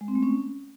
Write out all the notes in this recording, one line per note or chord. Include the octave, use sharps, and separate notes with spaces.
G#3
C4
A3
C#4